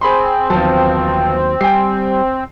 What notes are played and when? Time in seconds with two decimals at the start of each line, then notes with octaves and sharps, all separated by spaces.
0.01 C4 G#4 B5 C6
0.50 G1 D#2 F3 F#3 A5
1.61 G3 G5 G#5 C7